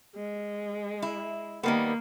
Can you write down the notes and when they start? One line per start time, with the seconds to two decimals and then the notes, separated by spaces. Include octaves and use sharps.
0.15 G#3
1.02 E4
1.63 D#3 G3 A#3 B3